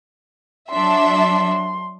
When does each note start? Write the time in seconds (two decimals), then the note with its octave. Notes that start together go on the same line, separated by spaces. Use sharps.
0.71 F#3 D4 E5 C6